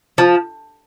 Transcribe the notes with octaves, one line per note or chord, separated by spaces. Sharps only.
F3